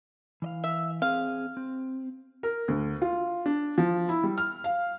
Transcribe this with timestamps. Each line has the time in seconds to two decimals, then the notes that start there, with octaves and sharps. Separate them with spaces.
0.42 E3 D#5 F5
0.64 E5
1.02 C4 G#4 F5
1.57 C4
2.43 A#4
2.68 D2
3.02 F4
3.46 D4
3.78 F3
4.09 E4
4.24 G3
4.38 F6
4.64 F5